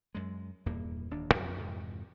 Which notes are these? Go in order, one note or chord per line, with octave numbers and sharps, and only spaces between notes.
F#2 G#3
D#1 E2 G2 A#3
D1 D#2 D4
F2
F2 G#2 C3 E3